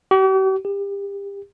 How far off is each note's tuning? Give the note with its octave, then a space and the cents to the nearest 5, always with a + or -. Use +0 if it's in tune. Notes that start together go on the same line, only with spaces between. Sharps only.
G4 -45
G4 +30